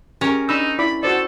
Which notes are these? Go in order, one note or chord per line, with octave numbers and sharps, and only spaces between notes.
C#4 G4 G#4 A#4
D4 D#4 B5 E6
E4 D5 B5 D6
F#4 A4 C5 D5